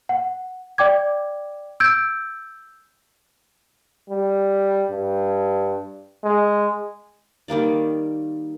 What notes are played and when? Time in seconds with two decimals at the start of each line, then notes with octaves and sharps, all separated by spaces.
0.09 F#5
0.78 D5 G5 D6 G#6
1.80 E6 G6 G#6 D7
4.10 G3
4.91 G2
6.24 G#3
7.48 D#3 G3 A#3 D5